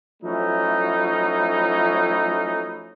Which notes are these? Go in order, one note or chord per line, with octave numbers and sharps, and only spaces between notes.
F3 F#3 A3 C#4 D#4 E4